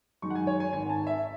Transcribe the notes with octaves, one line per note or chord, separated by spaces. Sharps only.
F#2 D#3 G#3 D#4 C#6
F#5
G#5
C#5
G#5
G#1 G#2 D#3 G#5
A5
E5